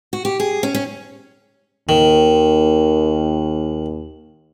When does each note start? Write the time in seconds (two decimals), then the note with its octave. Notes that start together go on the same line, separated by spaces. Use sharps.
0.13 F#4
0.25 G4
0.40 G#4
0.63 C#4
0.75 C#4
1.89 D#2 D#3